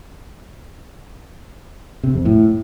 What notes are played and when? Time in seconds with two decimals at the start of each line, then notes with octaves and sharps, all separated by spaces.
2.03 C3
2.14 F2
2.25 A2